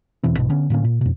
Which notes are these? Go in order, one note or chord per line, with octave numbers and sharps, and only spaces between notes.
E1 B2 E3 C4
B1 G#2 B2
D3 B3 C#4
A2 D3 A#3 C#4
A#2
F2 B2